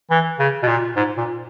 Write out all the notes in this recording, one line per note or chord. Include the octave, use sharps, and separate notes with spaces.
E3
C#3
B2
A#2
G#2
A#2